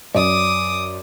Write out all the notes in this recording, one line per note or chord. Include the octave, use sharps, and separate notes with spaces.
F#2 D5 D6 D#6